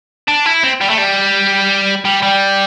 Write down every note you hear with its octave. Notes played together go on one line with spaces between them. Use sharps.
D4
E4
C4
G3
A3
G3
G3
G3